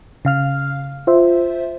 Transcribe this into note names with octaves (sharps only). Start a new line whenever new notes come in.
C#3 F5 F6
F4 C5 E5